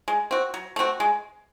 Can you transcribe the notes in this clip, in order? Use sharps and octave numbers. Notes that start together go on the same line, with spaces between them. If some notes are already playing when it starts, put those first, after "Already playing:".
G#3
C4 F#4
F#3
A3 C4 F#4
G#3